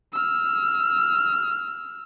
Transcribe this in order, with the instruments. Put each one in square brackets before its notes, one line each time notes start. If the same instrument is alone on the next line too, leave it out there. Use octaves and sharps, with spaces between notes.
[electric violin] E6 F6